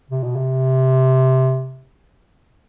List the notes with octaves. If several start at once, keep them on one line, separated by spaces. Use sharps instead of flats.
C3
B2
C3